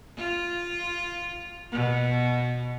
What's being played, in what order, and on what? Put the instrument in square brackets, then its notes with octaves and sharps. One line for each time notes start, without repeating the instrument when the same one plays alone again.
[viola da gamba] F4
B2